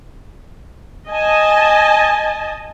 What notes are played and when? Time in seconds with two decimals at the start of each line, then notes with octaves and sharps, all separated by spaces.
1.08 D#5 G#5 A5